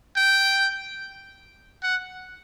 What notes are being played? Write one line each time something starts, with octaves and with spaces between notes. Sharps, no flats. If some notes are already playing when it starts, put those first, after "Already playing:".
G5
F#5